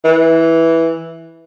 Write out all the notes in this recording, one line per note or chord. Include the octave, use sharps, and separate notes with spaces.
E3